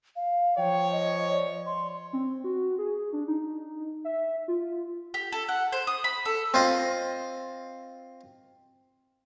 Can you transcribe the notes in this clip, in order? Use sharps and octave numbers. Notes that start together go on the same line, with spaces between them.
F5
F3 C#5 G5
D#5
D5
C6
C4
F#4
G#4
D4
D#4
E5
F4
G4
A4
F#5
C5
D#6
B5
A4
C4 F4 D#5